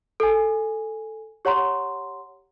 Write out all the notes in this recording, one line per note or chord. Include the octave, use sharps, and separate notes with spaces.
A4 G#5
G4 C#5 F#5 A#5 C6